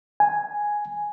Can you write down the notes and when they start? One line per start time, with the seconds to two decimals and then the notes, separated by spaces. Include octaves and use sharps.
0.20 G#5